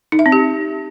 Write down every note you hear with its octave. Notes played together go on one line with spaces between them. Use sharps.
D#4
E5
C4
G4